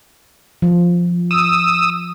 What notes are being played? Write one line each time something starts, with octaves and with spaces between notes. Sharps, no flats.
F3
D#6 E6